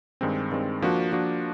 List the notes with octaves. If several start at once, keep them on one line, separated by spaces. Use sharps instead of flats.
G2 D#3 G#3 C4
G2 D#3 G#3 C4
F3 A#3 D4 F#4
F3 A#3 D4 F#4